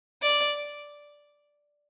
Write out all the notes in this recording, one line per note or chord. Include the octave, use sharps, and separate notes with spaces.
D5